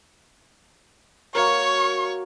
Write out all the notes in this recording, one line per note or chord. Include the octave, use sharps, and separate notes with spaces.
A#3 F#4 A#4 C#5 C#6